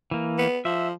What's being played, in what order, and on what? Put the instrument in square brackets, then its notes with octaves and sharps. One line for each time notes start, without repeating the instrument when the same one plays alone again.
[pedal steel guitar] E3 A#3
[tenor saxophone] B3
[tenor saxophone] F3 [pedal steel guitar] E5